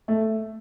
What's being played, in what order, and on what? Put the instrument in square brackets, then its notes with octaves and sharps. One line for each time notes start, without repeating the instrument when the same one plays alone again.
[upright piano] A3